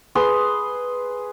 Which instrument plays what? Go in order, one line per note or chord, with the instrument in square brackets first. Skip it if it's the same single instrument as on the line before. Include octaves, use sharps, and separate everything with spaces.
[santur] G#4 B4 C6 D#6